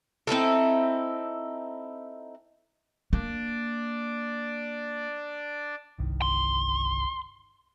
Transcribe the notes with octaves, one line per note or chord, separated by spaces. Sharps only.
C4 D#4 E4 A4
A#3 D4 D5
G1 C2 D#3
C6